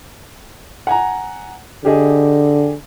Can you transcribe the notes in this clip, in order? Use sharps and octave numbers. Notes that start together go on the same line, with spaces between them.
F#5 G#5 A#5
D3 G4 G#4 D#5